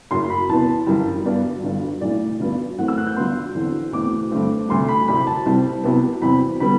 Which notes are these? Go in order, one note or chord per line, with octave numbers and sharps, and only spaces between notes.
F#1 F#2 F#3 C6
B5
E2 C3 E3 B3 A5
G1 F#2 E3 G3
G2 F#3 B3 D5
G1 G2 D3 F#3
B1 A2 E3 A3 D5
G1 G2 F#3 B3
F#2 E3 A3 C4 F#5
E6
F#6
G6
G1 G2 F#3 B3 C6
E2 D3 F#3 C4
E2 B2 A3 C4 D6
G2 D3 A3 C4
D2 C3 G3 C6
B5
C2 C3 F#3 C4 B5
A5
C2 C3 G3 C4
C2 C3 F#3 B3
E2 C3 F#3 C4 B5
D3 G3 B3 B5